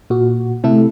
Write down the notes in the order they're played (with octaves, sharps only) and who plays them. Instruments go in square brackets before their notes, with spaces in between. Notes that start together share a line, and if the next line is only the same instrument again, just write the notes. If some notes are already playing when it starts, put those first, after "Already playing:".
[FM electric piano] A#2 F#4
C3 A3 E4 A4